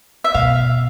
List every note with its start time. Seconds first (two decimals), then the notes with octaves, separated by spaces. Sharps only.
0.24 E5
0.34 B2 F5